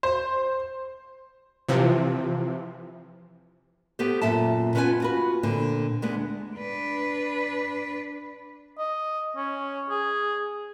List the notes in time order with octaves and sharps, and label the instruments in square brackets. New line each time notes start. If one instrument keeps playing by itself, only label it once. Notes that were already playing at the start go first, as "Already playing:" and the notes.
[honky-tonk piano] C5
[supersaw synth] C3 E3 F3
[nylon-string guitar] B3 G4 A4 C5
F#2 A#2 A4 E5 A5
B3 C#4 F4 B4 E5 G#5
F4 F#4 B4
A#2 D3 C4
D2 G#3 B3 D4
[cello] D4 B4
[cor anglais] D#5
C#4
G#4